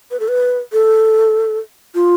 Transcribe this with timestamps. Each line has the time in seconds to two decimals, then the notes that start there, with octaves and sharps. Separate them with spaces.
0.11 B4
0.20 A4
0.28 B4
0.73 A4
1.95 F4